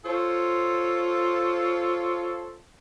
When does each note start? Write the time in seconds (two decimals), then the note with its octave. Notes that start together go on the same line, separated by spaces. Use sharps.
0.04 F4 A4 C5 C#5